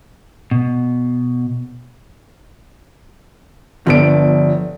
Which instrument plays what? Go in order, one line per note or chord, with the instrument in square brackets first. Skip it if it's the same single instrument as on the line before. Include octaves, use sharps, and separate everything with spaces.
[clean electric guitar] B2
[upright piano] G1 D7 [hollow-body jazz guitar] F3 B3 D4